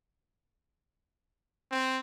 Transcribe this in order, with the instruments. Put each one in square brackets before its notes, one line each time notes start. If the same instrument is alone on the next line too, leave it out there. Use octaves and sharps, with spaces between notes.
[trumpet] C4